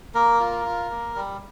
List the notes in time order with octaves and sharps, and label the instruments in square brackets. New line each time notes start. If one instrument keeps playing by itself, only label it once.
[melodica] A#3 A#4
F4
F4
A#3
G3